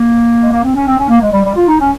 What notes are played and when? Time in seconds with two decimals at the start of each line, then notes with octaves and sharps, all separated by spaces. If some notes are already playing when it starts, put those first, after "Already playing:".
Already playing: A#3
0.42 G#3
0.52 A#3
0.63 C4
0.75 C#4
0.87 C4
0.98 C#4
1.09 A#3
1.21 G#3
1.32 G3
1.44 G3
1.55 F4
1.68 D#4
1.79 C#4